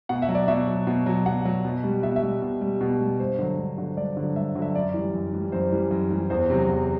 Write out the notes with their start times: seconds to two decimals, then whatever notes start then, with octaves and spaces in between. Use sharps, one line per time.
0.09 B2 F#5
0.22 E5
0.29 F#3
0.35 D5
0.48 B2 E5
0.67 F#3
0.87 B2
1.06 F#3
1.26 B2 F#5
1.45 F#3
1.65 B2
1.84 G3
2.03 B2 E5
2.16 E5
2.23 G3
2.42 B2
2.61 G3
2.81 B2
3.00 G3
3.20 G2 C5
3.39 D3 F#3
3.59 G2
3.78 D3 F#3
3.97 G2 D5
4.17 D3 F#3
4.36 G2 E5
4.55 D3 F#3
4.62 E5
4.75 F#2 D5
4.94 E3 G3
5.14 F#2
5.33 E3 G3
5.52 F#2 C5
5.72 E3 G3
5.91 F#2
6.10 E3 G3
6.30 E2 C5
6.49 C3 F#3
6.69 E2